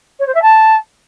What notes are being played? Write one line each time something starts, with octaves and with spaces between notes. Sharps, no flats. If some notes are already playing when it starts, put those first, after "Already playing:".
C#5
C5
E5
A5